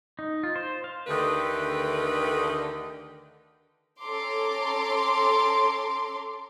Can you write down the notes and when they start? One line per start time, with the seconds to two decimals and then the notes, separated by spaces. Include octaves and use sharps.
0.19 D#4
0.43 F4
0.56 C5
0.84 F5
1.07 D2 D3 D#3 A3 G4 B4
4.01 C#4 A4 A#5 C6 D6